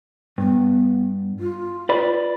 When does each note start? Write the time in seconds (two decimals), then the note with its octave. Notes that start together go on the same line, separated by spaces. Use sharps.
0.38 G2 B3
1.39 F4
1.89 B4 D5 B5